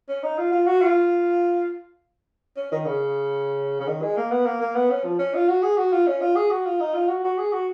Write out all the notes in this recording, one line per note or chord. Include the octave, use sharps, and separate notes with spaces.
C#4
D#4
F4
F4
F#4
F4
C#4
D#3
C#3
C#3
D#3
G#3
A#3
B3
A#3
A#3
B3
C#4
F3
C#4
F4
F#4
G#4
F#4
F4
C#4
F4
G#4
F#4
F4
D#4
F4
F#4
F#4
G#4
F#4